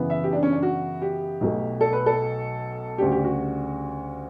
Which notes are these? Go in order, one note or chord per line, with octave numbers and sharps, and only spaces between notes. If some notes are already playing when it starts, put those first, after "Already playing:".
Already playing: F#2 C#3 E3 B3
E5
G4
D4
C#4
D4
F#4
G4
B1 B2 F#3 A3
A4
B4
A4
D2 C#3 G3 G4
G4
F#4